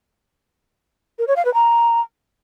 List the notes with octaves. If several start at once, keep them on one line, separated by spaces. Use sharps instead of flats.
A#4
C#5
F5
B4
A#5